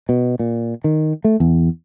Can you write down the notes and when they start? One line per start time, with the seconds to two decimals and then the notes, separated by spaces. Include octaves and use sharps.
0.09 B2
0.39 A#2
0.84 D#3
1.24 A3
1.40 E2